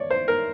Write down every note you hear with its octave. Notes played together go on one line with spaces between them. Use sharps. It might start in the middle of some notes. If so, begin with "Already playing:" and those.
Already playing: C#5 D5
C5
A#4